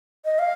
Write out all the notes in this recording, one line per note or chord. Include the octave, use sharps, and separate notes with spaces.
D#5
F5